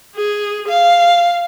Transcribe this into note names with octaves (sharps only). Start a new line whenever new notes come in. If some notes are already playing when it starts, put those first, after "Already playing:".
G#4
F5